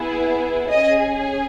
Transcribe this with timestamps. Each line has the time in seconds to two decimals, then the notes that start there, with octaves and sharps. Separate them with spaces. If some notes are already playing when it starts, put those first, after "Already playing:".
Already playing: B3 E4 G#4
0.69 C#4 G#4 D#5